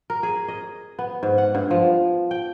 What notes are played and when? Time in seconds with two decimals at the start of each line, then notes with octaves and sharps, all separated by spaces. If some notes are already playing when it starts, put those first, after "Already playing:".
0.10 A#4
0.23 G#4
0.48 D#5
0.99 B3
1.23 G#2
1.38 F#5
1.55 G2
1.71 F3
2.31 G5